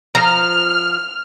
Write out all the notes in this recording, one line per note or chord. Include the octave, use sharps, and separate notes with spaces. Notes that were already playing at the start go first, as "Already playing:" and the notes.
F3 A#5 F6